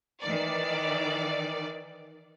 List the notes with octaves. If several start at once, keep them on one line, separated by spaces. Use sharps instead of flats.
D#3 E3 D5